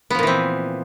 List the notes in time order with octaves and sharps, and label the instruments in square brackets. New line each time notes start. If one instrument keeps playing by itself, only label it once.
[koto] B3
F3
A#2
E3
C4